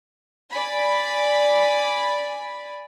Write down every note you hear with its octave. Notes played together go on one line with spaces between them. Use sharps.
D5 G#5 B5